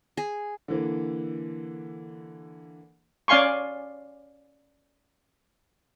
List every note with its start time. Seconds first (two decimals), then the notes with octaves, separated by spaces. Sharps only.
0.17 G#4
0.68 D3 E3 A#3
3.28 C#4 D5 F5 G#5 C6 C#6